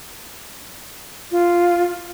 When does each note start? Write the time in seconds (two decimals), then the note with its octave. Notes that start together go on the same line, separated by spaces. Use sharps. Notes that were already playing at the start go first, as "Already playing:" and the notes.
1.31 F4